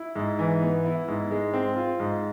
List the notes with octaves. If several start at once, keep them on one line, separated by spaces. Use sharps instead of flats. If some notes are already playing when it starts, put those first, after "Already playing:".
Already playing: E4
G#2
E3
B3
E4
G#2
G#3
C4
F4
G#2